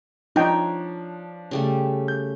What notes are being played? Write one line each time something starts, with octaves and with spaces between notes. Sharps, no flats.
F3 D4 D#4 C#5 G5
C#3 G3 A3
G6